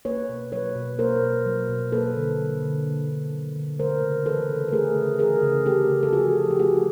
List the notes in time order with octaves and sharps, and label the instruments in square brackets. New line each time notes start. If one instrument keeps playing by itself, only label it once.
[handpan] A#3 B4 C#5
B2
F#3 B4 C#5
B2
A#3 A#4 C5
B2
F#3
B2
A#3 A4 B4
D3
F#3
D3
A#3
D3
F#3
D3
A3 A#4 C5
C#3
E3 A4 B4
C#3
B4
A3 G#4 A#4
C#3
E3 G#4 A#4
C#3
A3 G4 A4
C#3
A4
F3 F#4 G#4
C#3
G4
A3 F#4 G#4